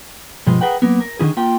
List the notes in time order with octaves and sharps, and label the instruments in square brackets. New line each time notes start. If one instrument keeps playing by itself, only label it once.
[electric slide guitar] G2 B2 F3 G#3
G#4 A#4 B4 F#5 G5
F#3 A#3 B3
A#4
D3 D#3 E4 G#4
A#3 F4 G5